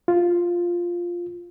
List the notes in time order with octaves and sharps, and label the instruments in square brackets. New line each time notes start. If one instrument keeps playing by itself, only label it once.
[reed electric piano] F4